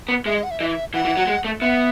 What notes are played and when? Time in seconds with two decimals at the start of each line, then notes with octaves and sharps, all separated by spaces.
0.09 B3
0.26 G#3 E5
0.35 D#5
0.43 F#5
0.51 E5
0.59 E3 D#5
0.67 E5
0.94 E3 F#5
1.05 E3
1.17 F#3
1.27 G#3
1.44 A3
1.61 B3 E5